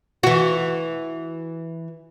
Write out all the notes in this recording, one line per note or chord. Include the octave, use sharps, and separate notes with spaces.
E3 F#4